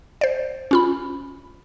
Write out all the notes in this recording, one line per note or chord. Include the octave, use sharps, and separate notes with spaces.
C5 D5
C#4 F4 B5